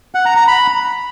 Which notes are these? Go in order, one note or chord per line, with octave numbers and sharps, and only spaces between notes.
F#5
A#5
A#5
B5